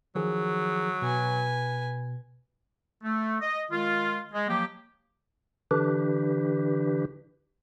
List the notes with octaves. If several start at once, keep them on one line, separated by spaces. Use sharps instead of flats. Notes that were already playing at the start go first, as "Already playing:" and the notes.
D#3 F3 F#3 G#4
B2 B4 G#5
A3
D#5
D#3 G#3 F4
G#3
F3 F#3 A#3 G4
D3 E3 D4 G4 B4